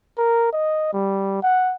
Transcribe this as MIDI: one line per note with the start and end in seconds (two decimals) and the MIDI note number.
0.18 0.51 70
0.53 0.91 75
0.93 1.41 55
1.42 1.74 78